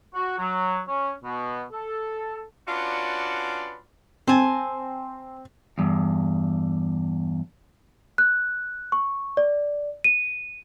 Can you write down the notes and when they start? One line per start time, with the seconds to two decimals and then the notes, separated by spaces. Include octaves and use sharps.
0.14 F#4
0.38 F#3
0.87 C#4
1.23 B2
1.72 A4
2.68 C#4 D4 F4 F#4 B4 D5
4.27 C4 C5 G#5 A5
5.78 E2 G2
8.18 F#6
8.92 C#6
9.37 D5
10.04 D#7